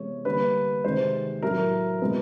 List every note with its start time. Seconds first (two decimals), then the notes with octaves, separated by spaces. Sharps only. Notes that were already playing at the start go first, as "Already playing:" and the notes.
Already playing: C3 E3 G#3 B3 C#5
0.25 D3 G3 A#3 B4
0.84 C3 D#3 G#3 C5
1.42 A2 F#3 A3 A#4
2.01 B2 G#3 B3